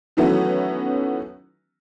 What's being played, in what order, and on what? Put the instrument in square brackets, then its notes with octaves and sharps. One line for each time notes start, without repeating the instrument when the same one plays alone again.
[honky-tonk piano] D#3 E3 F#3 A3 B3 C#4